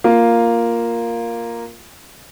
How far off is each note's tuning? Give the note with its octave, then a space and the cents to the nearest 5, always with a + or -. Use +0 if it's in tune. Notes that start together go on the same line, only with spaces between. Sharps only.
A#3 +0 F4 +0